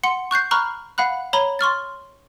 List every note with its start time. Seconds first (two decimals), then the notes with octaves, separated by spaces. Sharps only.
0.03 F#5 C6 C#7
0.31 C#6 F#6 G6 C7
0.51 A#5 B5 C#6 F6 F#6
0.98 F5 F#5 B5 F#6
1.33 C#5 A#5 B5 G7
1.59 C6 C#6 F6 A6